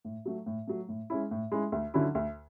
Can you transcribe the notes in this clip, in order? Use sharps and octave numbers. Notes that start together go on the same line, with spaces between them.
A2
F#3 A3
A2
F#3 A3
A2
G#3 C#4 E4
A2
G#3 C#4 E4
D2
D3 F#3 C#4 E4
D2